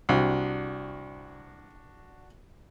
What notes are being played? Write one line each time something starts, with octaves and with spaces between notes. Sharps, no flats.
C2 D4 F#4